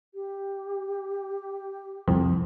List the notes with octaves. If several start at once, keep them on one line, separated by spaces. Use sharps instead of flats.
G4
C2 F2 C4